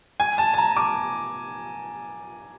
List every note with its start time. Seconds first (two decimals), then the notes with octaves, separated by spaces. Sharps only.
0.20 G#5
0.38 A5
0.54 A5
0.58 A#5
0.77 D6